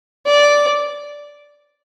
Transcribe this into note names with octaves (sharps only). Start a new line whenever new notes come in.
D5